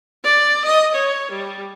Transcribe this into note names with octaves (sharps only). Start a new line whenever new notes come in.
D5
D#5
C#5
G3